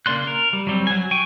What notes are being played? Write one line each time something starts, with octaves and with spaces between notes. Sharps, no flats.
C#3 A#3 D5 C6 F#6
A#4
G3
F#3 G3 C4
F#3 G#5
G5 G#5 C#6